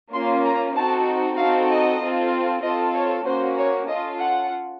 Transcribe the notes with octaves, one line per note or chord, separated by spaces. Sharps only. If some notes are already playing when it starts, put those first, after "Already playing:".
A#3 C#4 F4 C6
A#5
C4 D#4 F#4 A4 A5
C4 D#4 F#4 A4 F5
D#5
C4 F4 A4
C4 F4 A4 D#5
C#5
A#3 C#4 F#4 C5
C#5
C#4 F4 A4 D#5
F#5